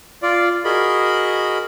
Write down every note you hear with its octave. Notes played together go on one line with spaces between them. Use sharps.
F4 D5
F#4 G#4 A#4 D#5 B5